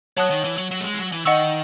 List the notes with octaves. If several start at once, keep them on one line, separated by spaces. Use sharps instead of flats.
F#3 C#5 F#5 A5 D#6 F#6
D#3
E3
F#3
F#3
A3
G#3
E3
F#3
E3
D#3 D#5 F#5 C#6 E6